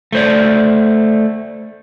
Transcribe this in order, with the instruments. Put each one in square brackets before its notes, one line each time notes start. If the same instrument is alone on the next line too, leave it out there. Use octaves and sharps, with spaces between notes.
[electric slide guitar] A3 C5 D5